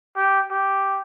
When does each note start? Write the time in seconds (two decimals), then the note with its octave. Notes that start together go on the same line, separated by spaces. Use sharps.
0.16 G4
0.51 G4